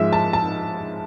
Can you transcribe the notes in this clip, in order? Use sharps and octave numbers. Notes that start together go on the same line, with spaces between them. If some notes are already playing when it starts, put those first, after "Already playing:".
Already playing: G#2 F3 G#3 E5
A5
A5